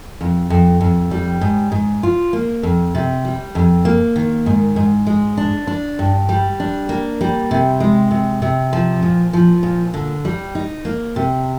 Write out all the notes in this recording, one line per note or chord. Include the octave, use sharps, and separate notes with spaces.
F2
F2
F2
G3
G#2
G#2
F4
A#3
F2
C3
G3
F2
A#3
D#3
G#2
G#2
G#3
D4
D4
G2
G3
D4
A#3
G3
C3
G#3
C3
C3
F3
A#2
F3
A#2
D3
G3
D#4
A#3
C3